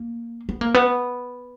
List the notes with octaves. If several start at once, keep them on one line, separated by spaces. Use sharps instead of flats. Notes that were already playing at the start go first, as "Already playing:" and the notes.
Already playing: A#3
B3
A#3
B3